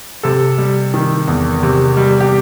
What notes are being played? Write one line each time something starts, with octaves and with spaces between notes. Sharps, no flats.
C3 A4
G3
D#3
E2
C3
G3
G4